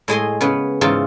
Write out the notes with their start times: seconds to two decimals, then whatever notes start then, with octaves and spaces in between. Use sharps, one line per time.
0.08 A2 G#3 D#5 C6
0.41 C#3 B3 B4
0.81 G#2 C#3 E3 F4